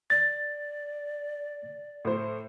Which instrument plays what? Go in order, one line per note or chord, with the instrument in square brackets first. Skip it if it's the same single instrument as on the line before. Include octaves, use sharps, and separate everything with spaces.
[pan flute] D5 [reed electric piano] A6
[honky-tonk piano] A2 C5